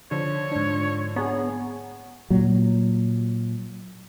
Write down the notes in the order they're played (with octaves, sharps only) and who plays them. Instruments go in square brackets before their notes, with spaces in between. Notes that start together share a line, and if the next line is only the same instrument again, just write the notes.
[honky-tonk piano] D3 F3 [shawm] C#5
[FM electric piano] G#2 D4
[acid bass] B3 [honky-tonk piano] G#4 A#5 [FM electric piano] C#5
[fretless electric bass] A#2 F#3